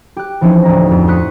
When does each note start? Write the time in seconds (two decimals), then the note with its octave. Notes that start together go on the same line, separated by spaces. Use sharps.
0.17 G4 F#6
0.41 E3 F3 C4 C#4 D#4
0.64 D2 A2 A#5 A#6
0.91 F2
1.07 C6 C#6 D#6 F#6 B6 C#7